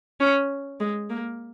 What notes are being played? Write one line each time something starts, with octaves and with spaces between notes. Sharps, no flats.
C#4
G#3
A#3